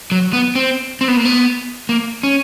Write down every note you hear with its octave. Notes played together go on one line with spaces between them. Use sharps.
F#3
B3
C4
C4
B3
A#3
B3
A#3
C#4